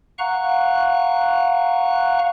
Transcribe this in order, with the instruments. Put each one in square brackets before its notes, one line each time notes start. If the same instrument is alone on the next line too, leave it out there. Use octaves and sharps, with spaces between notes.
[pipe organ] F5 F#5 A#5 C#6 F#6